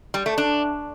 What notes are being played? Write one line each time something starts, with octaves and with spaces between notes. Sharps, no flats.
G3
A3
D4